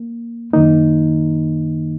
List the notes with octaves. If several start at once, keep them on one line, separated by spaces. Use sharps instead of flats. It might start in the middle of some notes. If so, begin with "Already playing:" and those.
Already playing: A#3
F#2 D#3 A#3 D#4